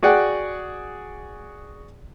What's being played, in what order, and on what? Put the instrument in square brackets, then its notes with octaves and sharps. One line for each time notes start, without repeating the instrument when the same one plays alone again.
[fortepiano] F#4 G#4 D5 F#5 G5